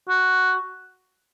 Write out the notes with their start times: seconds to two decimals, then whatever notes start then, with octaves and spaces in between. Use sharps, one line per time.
0.09 F#4